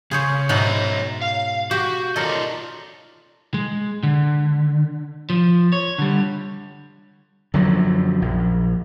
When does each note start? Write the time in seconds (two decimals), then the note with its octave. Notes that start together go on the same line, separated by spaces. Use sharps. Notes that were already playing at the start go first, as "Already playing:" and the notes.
0.11 C#3 G#4 C5 C#5
0.49 G#2 B2 C#5 E5 A#5 B5
1.22 F5
1.71 F#4 G4
2.16 F4 A4 A#4 D5 D#5
3.54 G#3
4.03 D3
5.30 F3
5.73 C#5
5.98 D3 G3
7.54 F#2 D3 F3 F#3
8.22 A#1